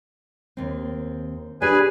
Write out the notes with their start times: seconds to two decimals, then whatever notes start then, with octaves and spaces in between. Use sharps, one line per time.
0.57 D#2 C4
1.62 D4 G4 G#4 B4 D5 G#5